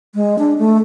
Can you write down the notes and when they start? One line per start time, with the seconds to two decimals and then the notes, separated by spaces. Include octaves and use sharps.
0.15 G#3
0.39 D4
0.58 A3